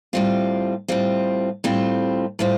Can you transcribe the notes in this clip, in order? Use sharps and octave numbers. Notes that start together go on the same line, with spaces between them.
A2 G3 C4 F4
A2 G3 C4 F4
A2 G3 C4 F4
A2 G3 C4 F4